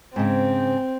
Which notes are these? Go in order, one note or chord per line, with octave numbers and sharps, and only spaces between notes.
G#2 C#3 C4